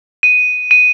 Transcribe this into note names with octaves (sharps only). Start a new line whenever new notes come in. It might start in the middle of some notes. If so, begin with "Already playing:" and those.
D#7
D#7